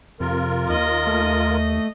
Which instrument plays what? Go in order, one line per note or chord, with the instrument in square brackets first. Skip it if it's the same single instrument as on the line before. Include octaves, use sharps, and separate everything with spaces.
[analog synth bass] F2 [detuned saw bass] C3 [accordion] F4 A#4
[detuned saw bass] D#2 [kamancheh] D#5
[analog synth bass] A3